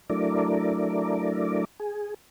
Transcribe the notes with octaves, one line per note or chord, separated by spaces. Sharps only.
F#3 A3 D4 E4 A#4 D5
G#4